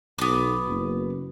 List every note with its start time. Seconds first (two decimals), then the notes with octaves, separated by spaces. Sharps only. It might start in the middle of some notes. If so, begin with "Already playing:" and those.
0.19 B1 B3 D6
0.68 F#1